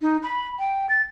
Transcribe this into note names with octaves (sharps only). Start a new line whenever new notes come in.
D#4
B5
G5
A6